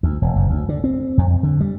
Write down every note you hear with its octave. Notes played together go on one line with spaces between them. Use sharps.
D2
E1
F#1
D2
D3
C4
F2
D3
G3